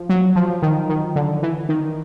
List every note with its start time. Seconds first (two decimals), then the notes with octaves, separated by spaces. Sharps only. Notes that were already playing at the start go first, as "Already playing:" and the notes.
Already playing: F3
0.09 F#3
0.36 F3
0.62 D#3
0.89 D#3
1.16 D3
1.43 E3
1.69 D#3